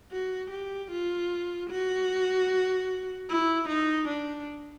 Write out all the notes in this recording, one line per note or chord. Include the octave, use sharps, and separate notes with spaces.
F#4
G4
F4
F#4
E4
D#4
D4